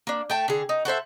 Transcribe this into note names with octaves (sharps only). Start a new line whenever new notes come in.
A#3 D4
A3 G5 A5
D3 G#4
D#4
F#4 A4 C5 E5